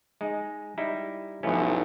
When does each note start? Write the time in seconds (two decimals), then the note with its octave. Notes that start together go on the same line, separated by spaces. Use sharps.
0.21 G#3 D#4
0.78 G3 D#4 E4
1.43 B1 G2 F3 A3 C#4 E4